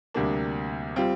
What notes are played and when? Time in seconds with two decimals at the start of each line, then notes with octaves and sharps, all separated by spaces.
0.14 D2 C3 G3 A#3 D4
0.96 G3 C4 F4